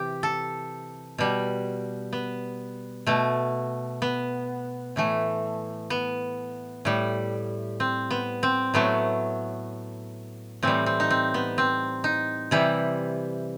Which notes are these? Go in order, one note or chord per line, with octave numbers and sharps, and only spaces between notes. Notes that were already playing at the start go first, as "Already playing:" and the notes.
Already playing: C3 E3 G4
A4
B2 G3
B3
B2 A3
B3
A2 E3 A3
B3
A2 G3
C4
B3
C4
A2 F#3 A3 B3
A2 E3 G3 C4
C4
D#4
C4
B3
C4
D#4
C3 E3 G3 E4